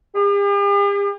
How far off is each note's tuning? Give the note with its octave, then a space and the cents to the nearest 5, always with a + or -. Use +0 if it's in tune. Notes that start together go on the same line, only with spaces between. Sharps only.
G4 +45